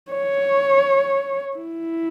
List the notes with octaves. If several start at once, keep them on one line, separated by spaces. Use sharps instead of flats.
C#5
E4